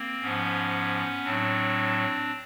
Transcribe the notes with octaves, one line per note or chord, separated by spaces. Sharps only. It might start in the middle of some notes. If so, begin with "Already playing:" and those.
Already playing: A#3 C4
G#2 F3 B3 C#4
A2 F#3 C4 D4